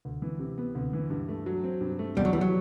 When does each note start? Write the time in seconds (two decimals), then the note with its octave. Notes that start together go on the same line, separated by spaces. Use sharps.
0.05 D2
0.22 E3
0.39 C3
0.58 B3
0.75 D2
0.93 E3
1.10 G2
1.28 A3
1.46 F#3
1.64 C4
1.81 G2
1.99 A3
2.17 E2 G3
2.25 F#3
2.33 E3 G3
2.41 F#3